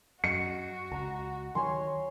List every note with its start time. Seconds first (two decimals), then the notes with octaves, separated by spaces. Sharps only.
0.24 F#2 F#4 D#5 C#7
0.92 C#2 A#5
1.55 D#3 F#3 C#5 G#5 C6